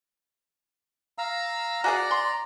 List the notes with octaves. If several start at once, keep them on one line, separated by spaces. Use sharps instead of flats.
F5 A#5 E6
F#4 G#4 D5 F#5 A#5
C6